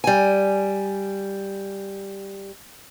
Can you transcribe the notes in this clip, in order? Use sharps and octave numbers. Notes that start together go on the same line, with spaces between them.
G3 G#5